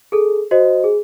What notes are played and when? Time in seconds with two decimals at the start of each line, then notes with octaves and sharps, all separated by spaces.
0.12 G#4 A4
0.51 F#4 C5 D#5
0.84 G#4